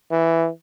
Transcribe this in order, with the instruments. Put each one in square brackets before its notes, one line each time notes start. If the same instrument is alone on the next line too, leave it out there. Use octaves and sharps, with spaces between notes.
[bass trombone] E3